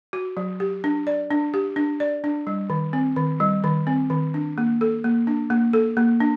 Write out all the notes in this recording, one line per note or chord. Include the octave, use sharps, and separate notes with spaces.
F#4
F#3
G4
D4
D5
D4
G4
D4
D5
D4
G3
D#3
C4
D#3
G3
D#3
C4
D#3
D4
A#3
A4
A#3
D4
A#3
A4
A#3
D4